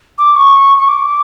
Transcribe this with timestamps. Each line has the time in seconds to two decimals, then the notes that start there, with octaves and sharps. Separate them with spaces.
0.18 D6
0.36 C#6
0.77 C#6
0.88 D6